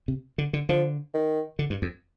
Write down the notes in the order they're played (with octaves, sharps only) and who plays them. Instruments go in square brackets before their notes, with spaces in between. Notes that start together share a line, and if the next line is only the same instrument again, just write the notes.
[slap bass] C3
D3
D3
[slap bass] D3 [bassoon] F3
[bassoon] D#3
[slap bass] D3
G2
F2